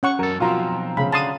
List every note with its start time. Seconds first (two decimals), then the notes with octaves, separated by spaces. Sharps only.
0.03 C#4 F#5 C#6
0.19 F#2 A4 A#4
0.40 B1 F3 C4 F4 F#4 A#5
0.97 C#3 B5
1.13 D3 A5 C6 D#6